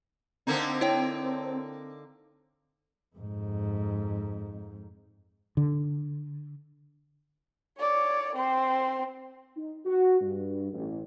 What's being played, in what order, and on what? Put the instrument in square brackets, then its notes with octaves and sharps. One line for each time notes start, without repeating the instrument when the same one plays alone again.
[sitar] D3 A#3 D#4 [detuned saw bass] C4
[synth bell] E4 C#5 G5
[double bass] F2 G#2
[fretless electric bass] D3
[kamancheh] C#5 D5
C4 C5
[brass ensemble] D#4
F#4
G2
A1